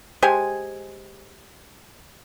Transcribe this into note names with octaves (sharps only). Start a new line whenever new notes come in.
G#3 G4 C5 G#5